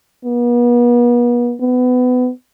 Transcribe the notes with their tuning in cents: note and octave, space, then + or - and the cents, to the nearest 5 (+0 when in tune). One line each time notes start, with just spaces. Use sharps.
B3 -40
B3 +25